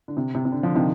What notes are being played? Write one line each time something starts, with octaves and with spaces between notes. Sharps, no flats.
D3
C3
C3
C3
D3
D3 F3
C3 D#3